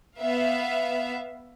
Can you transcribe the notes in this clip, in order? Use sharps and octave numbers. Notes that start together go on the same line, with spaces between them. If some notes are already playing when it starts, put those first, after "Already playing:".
B3 E5 F5